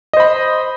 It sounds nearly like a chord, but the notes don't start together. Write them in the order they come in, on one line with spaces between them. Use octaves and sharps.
D#5 C5 B5